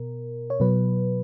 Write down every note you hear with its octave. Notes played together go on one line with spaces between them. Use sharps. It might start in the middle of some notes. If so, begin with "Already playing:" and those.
Already playing: B2 A#4
C#5
B2 F#3 B4